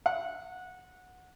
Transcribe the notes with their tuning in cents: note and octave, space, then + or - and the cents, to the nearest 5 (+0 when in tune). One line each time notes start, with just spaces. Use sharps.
F#5 -15